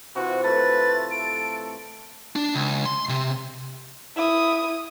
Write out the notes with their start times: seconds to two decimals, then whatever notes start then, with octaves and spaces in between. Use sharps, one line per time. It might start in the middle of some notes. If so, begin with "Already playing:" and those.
0.16 C3 E3 F4 F#4
0.44 A3 B4 A6
1.11 A4 D7
2.36 D4
2.54 C#2
2.85 C6
3.09 C3
4.16 E4 D#6